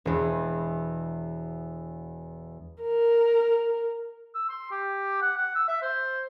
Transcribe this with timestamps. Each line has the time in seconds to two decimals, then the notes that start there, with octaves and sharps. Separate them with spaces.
0.05 E1 E2
2.82 A#4
4.35 E6
4.49 C6
4.71 G4
5.22 F#5
5.37 F#5
5.56 E6
5.68 E5
5.82 C5